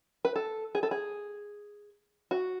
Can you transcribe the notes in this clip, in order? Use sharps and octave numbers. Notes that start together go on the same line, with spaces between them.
B4
A4
G#4
A4
G#4
F#4